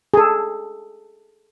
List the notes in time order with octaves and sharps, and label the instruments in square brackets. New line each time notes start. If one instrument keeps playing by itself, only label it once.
[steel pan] G#4 A4